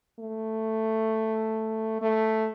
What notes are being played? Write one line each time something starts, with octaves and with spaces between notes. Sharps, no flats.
A3
A3